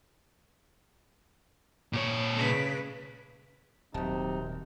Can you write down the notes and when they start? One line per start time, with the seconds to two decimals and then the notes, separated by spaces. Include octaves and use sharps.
1.93 A#2 C#5
2.37 C#3 B4
3.94 D#1 C3 F#3 D#4 A5